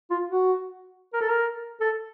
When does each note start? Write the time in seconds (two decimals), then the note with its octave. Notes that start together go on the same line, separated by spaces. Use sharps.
0.11 F4
0.30 F#4
1.13 A#4
1.21 A4
1.29 A#4
1.81 A4